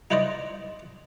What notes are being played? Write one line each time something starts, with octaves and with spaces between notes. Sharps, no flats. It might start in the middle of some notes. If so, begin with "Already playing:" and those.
D#4 E4 B4 C5 D5 D#5